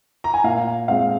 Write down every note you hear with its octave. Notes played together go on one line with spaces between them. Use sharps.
A#5
G#5
A#2 F5
G#3 C4 F5